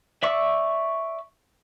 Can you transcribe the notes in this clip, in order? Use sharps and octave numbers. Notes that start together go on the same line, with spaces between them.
D5 E5 C#6 D6 E6